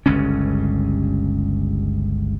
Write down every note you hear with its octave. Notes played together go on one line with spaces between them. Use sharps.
G1 C#2 G2 C#4